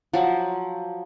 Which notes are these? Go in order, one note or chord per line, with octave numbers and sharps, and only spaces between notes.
F3 F#3